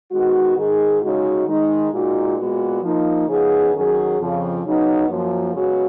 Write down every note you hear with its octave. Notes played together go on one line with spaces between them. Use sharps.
D#3 G#3 B3 F#4
G#2 D#3 G#3 D#4 G#4
C#3 G#3 D#4 F#4
D#3 G#3 D#4
A#2 G#3 D#4 F#4
A#2 G#3 B3 F#4
F3 A#3 D#4
C#3 F3 B3 D#4 G#4
F#2 D#3 F#3 C#4 G#4
F2 C#3 F3
C#3 F#3 B3 D#4
F#2 F3 A#3
C#3 G#3 B3 F#4